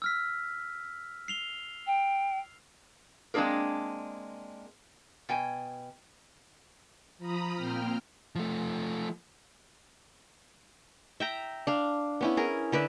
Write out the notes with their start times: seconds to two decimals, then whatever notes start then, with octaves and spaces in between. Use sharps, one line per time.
0.02 E6 F6 B6
1.28 C7 F7 G7
1.87 G5
3.34 G#3 A#3 C4 D4 G#4 A#4
5.29 B2 G5 G#5
7.18 F3 A#5 B5 D#6
7.54 A#2 A#3 C4 G5 F6
8.35 F3 A3
11.20 E5 G5 A#5
11.67 D4 F5
12.21 B3 C#4 E4
12.37 G#4 A#4
12.72 D3 B4 D5 E5